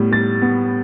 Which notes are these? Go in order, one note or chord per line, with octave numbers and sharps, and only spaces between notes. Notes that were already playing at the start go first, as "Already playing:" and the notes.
Already playing: A2 G3 B3
G3 A6
B3